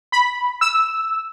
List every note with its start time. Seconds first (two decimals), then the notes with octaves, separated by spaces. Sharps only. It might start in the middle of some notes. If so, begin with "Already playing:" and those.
0.12 B5
0.61 E6